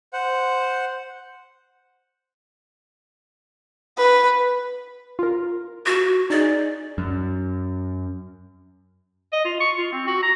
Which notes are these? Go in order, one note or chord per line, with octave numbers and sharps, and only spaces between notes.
C5 F#5
B4
F4 A#4
F#4
D#4 G#4 D5
F#2
D#5
F4
C#6
F4
C4
F#4
A#5